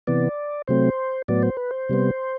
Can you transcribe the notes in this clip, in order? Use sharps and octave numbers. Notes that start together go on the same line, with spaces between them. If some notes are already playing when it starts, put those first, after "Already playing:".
C3 E3 B3 D5
C3 F#3 A3 C4 C5
A2 F#3 B3 D5
C5
B4
C5
C3 G3 B3